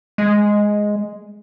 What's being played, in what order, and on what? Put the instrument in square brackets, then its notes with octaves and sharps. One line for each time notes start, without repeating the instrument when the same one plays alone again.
[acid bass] G#3